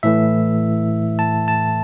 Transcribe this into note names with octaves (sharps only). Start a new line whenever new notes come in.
A2 E3 A3 E5
A5
A5